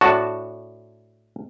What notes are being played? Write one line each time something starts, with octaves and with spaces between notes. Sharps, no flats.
A2 D4 F#4 A5